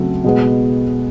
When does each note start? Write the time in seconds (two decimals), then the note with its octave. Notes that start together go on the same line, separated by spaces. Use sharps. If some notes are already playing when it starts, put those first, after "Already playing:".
Already playing: C#3 F#3 A3 C4
0.24 B2 G#3 B3